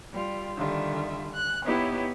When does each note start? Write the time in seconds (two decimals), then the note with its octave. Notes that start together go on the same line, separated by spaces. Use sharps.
0.12 G3 F4
0.58 D3 D#3 G3 F4 E5
1.32 F#6
1.65 B3 D#4 E4 G4 B4 C#5